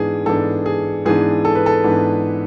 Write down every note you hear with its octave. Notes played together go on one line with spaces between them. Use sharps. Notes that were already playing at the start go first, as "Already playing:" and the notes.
Already playing: G#2 E3 B3 D4 G#4
G#2 E3 B3 D4 A4
G#4
G#2 E3 B3 D4 G#4
A4
B4
A4
G#2 E3 B3 D4